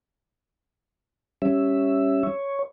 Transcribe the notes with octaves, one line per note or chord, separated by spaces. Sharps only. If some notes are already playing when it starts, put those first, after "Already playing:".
G3 C#4 E5
C#5